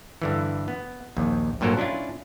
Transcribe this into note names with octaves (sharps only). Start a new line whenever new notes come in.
G2 D3 E3
B3
A#1 D#2
G2 A#2 F#3 A4 A#4 C5
C#4 D4 E4 F4